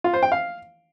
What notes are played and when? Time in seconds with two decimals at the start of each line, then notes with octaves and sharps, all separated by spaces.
0.04 F4
0.13 C5
0.23 G5
0.32 F5